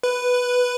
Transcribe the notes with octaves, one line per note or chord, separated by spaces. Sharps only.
B4